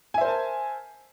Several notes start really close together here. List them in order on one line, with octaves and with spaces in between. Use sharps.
G#5 E5 C5 A#4 A5